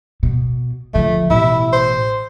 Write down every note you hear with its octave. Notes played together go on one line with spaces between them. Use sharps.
B2
D3 F3 A3
A1 B2 E4
C5